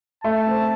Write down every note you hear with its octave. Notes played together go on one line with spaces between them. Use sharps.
A3 A5
C4